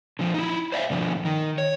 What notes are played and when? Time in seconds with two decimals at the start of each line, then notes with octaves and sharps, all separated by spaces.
0.19 D3 F3
0.34 D#4 E4
0.72 C5 D5 E5 F5
0.90 G2 B2 D3 F3
1.25 D#3
1.58 C#5